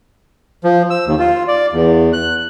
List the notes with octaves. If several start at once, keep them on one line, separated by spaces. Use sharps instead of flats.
F3
E6
D#2
F4
D5
E2
F#6